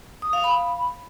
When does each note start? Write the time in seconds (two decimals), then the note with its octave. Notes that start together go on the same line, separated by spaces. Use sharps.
0.22 D#6
0.33 F5
0.44 B5